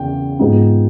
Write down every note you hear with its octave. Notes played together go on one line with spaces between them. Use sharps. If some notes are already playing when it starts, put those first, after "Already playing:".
Already playing: E2 C#3 G5
G#2 F3 G#3 B3